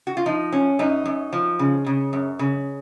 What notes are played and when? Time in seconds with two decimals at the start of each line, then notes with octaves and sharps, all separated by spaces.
0.07 F#4
0.17 F4
0.26 F3 D#4
0.52 F#2 C#4
0.79 F#2 D#4
1.05 F#2
1.33 F3
1.59 C#3
1.86 C#3
2.13 F#2
2.39 C#3